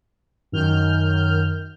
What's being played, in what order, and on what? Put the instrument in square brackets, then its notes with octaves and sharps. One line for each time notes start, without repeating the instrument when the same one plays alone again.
[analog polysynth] F#2 D#3 F6 G6